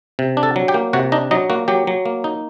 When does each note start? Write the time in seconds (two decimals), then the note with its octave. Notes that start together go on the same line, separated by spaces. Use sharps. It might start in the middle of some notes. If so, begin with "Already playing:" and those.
0.19 C3
0.37 D4
0.43 A4 A5
0.56 F#3
0.68 G4 G5
0.74 A#3
0.93 C3 F#4 F#5
1.12 D4 D#4 D#5
1.31 F#3 D#4 D#5
1.50 A#3 F#4
1.68 F#3 G4
1.87 F#3
2.05 A#3
2.24 D#4